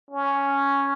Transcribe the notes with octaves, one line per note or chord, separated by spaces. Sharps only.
C#4